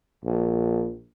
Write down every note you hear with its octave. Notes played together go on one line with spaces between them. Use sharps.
A#1